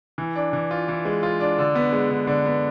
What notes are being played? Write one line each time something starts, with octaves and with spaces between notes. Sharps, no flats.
E3
D4
E3
F4
E3
G#3
F4
D4
D3
B3
G#3
D3
D3
B3